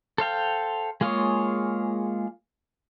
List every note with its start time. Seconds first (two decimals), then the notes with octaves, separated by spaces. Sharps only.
0.18 A4 C5 F5 G5
1.01 G#3 A#3 F4 G#4 C#5